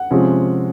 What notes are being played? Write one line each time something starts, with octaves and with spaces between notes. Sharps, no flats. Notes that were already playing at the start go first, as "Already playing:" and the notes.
Already playing: F#5
C3 F3 G#3 C#4